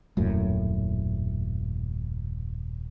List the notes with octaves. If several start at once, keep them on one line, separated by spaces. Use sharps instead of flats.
D#1 F#2 A2